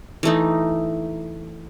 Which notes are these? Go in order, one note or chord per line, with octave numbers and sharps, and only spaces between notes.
E3 A3 D#4